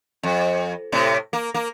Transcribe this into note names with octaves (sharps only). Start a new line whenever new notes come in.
F2
A2 C3
A#3
A#3